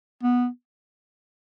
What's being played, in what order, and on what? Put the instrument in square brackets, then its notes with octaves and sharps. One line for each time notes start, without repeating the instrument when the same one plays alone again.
[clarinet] B3